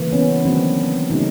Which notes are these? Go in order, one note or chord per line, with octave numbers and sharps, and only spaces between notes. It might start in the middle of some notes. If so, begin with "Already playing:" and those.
Already playing: C#3 E3 G3 A#3
B3 C#4
D#3 F#3 A#3 C4 D4
C#3 F#3 A3 C#4 D#4